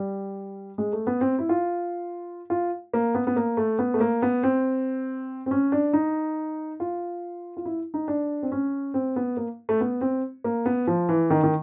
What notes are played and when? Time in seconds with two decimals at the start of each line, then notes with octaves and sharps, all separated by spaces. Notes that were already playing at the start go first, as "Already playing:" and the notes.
Already playing: G3
0.78 G#3
0.93 A3
1.07 B3
1.21 C4
1.39 E4
1.49 F4
2.50 F4
2.94 A#3
3.15 B3
3.27 B3
3.36 A#3
3.57 A3
3.79 B3
3.94 A3
4.00 A#3
4.22 B3
4.43 C4
5.46 C4
5.51 C#4
5.72 D4
5.93 D#4
6.80 F4
7.57 F4
7.65 E4
7.94 D#4
8.08 D4
8.43 C4
8.52 C#4
8.94 C4
9.16 B3
9.37 A#3
9.69 A3
9.81 B3
10.01 C4
10.44 A#3
10.66 B3
10.87 F3
11.09 E3
11.30 D#3
11.43 D#3